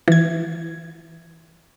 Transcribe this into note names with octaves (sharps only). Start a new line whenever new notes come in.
E3 G#6